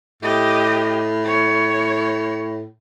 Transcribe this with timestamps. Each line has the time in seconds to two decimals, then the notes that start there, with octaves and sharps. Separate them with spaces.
0.23 A2 G4 D#5
1.25 C#5